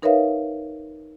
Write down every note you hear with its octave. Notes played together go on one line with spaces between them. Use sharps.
D#4 A#4 B4 C#5 E5 F5